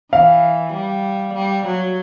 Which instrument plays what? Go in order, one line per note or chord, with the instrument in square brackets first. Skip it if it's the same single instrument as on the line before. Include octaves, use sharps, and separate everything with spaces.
[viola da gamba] E3 [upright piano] F5
[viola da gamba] G3
G3
F#3